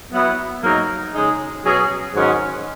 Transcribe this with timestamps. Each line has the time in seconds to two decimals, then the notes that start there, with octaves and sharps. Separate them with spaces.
0.12 F#3 B3 E4
0.62 G#2 F#3 A#3 D#4
1.13 C#3 G#3 D#4 G#4
1.63 B2 F#3 C#4 G#4
2.14 G#2 D#3 F#3 C#4